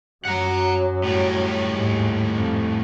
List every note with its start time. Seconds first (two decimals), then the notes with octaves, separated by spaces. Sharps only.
0.25 F#2 F#3 F#5 A#5
1.04 A2 G3
1.70 D#2 G#2
2.32 F2